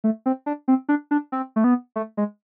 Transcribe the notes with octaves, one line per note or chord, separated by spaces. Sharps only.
A3
C4
D4
C4
D4
D4
C4
A3
B3
A3
G#3